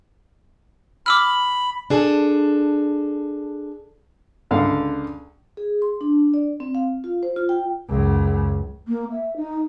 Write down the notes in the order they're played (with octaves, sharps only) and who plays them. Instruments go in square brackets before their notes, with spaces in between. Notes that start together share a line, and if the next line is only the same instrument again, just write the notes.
[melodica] B5 [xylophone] D6 E6 F6
[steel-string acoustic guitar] D4 G#4 A4
[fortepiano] C#2 D3 F5
[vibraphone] G#4
C6
D4
D5
C4
F5
F4
C5
F4
G5
[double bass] C#2 F#2
[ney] A#3
E5
D#4